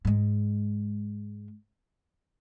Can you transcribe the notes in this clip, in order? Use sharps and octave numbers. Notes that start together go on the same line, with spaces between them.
G#2 G#3